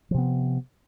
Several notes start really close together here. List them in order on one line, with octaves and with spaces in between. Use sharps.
F3 C3 B3